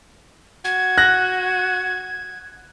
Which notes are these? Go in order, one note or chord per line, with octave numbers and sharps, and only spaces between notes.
F#4 G#6
F#6 A#6